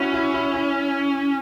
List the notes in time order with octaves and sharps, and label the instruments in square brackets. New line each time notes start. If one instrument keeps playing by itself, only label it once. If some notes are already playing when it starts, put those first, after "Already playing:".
Already playing: [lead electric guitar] C#4 [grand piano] E4 F#4
[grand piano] E4
E4
E4